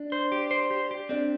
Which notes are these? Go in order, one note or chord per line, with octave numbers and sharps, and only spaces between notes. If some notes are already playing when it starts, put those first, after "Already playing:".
Already playing: D4
C5
G4
C5
G4
G4
C4 D4